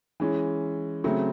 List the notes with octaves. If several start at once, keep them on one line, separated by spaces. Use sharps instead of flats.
E3 G#3 C#4
C#3 F#3 A3 C4